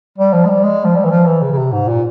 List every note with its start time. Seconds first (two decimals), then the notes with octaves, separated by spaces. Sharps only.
0.18 G3
0.33 F3
0.45 G#3
0.49 G3
0.64 G#3
0.85 F3
0.95 G3
1.04 E3
1.11 F3
1.26 E3
1.42 C#3
1.52 C#3
1.57 C3
1.72 G#2
1.88 A#2